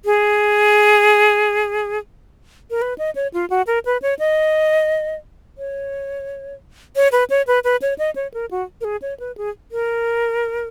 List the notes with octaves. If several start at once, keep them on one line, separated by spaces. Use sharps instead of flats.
G#4
A#4
B4
D#5
C#5
F4
F#4
A#4
B4
C#5
D#5
C#5
C#5
B4
C#5
B4
B4
C#5
D#5
C#5
A#4
F#4
A#4
G#4
C#5
B4
G#4
A#4